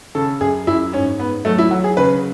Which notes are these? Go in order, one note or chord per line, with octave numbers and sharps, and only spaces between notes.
C#3 A4
F#2 G#4
F#2 E4
G#2 C#4
G#2 B3
F#3 A3
E4
F#3 F#4
G#4
C#3 B4